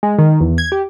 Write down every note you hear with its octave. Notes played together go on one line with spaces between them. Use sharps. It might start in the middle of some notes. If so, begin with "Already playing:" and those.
G#3
D#3
E2
G#6
G4